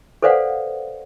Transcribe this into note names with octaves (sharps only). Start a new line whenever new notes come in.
A4 B4 C5 D5 F5 F#5